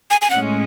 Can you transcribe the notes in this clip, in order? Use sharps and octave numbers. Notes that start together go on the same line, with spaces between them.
G#5
G#5
A2 G#3 C#4 F#5